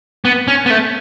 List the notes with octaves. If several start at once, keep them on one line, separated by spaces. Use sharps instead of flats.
B3
C#4
B3
A3